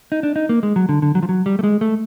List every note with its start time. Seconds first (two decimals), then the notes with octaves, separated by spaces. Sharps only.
0.12 D#4
0.23 D4
0.36 D#4
0.49 A#3
0.63 G#3
0.76 F#3
0.89 D3
1.02 D3
1.15 F#3
1.23 F3
1.29 F#3
1.46 G3
1.59 A3
1.64 G#3
1.81 A3